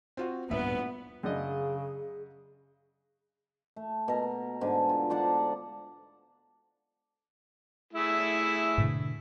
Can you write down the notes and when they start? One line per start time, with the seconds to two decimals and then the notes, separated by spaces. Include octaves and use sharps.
0.17 C4 F4 F#4
0.51 D1 G2 A#2 B3 E5
1.23 F#2 C#3 D4 G#4 D#5
3.76 A3
4.08 B2 A#4
4.61 G#2 D3
4.89 F4
5.10 D4 C5 D5 F#5
7.93 A3 E4 G#4
8.78 G#2 B2 D3